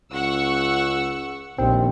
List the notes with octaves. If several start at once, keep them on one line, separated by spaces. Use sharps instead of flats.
C#2 F#5 C#6 E6
A#1 D#2 C4